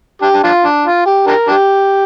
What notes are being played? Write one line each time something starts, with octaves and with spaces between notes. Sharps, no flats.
D4 G4
D4
D4 F4
D4
F4
G4
D4 G4 A#4
D4 G4